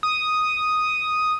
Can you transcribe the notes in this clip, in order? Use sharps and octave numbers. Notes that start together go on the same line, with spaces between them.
D#6